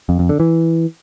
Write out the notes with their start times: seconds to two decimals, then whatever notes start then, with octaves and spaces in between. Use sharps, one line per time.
0.09 F2
0.19 F2
0.29 D3
0.40 E3